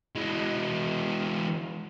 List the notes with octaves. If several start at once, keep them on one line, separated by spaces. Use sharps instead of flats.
E3 G#3